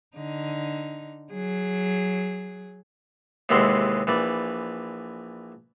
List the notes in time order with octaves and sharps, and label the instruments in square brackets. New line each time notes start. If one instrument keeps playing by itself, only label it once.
[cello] D3 D#4
F#3 G#4
[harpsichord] D#2 C3 E3 G#3 F#5 C6
A#1 E3 D5